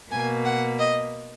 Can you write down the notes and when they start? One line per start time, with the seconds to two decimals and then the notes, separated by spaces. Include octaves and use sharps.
0.11 B2 A#3 G#5
0.45 F#5
0.79 D#5